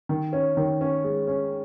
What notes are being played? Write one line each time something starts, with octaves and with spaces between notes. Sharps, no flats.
D#3
C#4
D#3
C#4
G#3
C#4